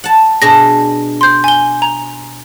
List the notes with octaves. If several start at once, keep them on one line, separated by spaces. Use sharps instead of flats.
F#5 A5
B2 D4 G#4 A#6
C6 G6
G#5 G7
A#5